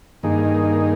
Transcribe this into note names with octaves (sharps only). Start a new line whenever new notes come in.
G2 D#3 A#3 D#4 G#4